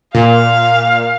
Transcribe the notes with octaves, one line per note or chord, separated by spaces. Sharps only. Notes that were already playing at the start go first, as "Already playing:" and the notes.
A#2 F5